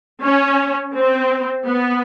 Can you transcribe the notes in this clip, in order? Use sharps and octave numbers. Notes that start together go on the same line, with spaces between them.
C#4
C4
B3